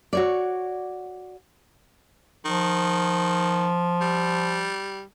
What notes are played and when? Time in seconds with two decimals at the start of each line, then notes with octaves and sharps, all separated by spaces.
0.13 F#4 C#5 D5
2.45 D#3 F3
4.01 G3